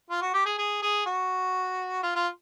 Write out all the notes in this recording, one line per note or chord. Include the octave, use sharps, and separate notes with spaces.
F4
F#4
G4
G#4
G#4
G#4
F#4
F4
F4